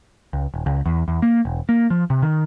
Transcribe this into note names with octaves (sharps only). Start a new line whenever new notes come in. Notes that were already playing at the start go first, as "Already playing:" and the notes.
C#2
D#1
C#2
E2
E2
A#3
E1
A#3
F3
C3
D#3